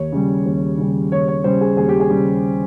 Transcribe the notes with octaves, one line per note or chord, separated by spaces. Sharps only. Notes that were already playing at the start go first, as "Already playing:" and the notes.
Already playing: D#2 C#5
C#3 G3
D#2
C#3 G3
D#2 C#5
C#5
C#3 G3 C5
G#4
D#2 G#4
G4
G#4
C#3 G3